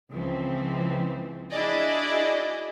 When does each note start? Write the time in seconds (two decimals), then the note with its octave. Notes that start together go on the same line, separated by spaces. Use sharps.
0.11 C#2 E3 F3 C4
1.50 D4 E4 F#4 G#4 D5 D#5